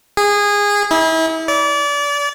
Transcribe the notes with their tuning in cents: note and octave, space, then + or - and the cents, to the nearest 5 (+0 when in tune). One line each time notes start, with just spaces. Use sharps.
G#4 -20
E4 -35
D5 -30